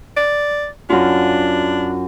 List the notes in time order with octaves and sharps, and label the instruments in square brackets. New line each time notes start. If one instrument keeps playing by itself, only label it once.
[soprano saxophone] D5
[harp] F#2 F4 [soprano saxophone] D4